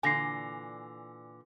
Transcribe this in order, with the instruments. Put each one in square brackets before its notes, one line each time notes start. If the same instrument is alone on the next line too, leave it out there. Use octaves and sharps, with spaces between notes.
[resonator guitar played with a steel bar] A#2 D3 E3 [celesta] G#5 A#6 C7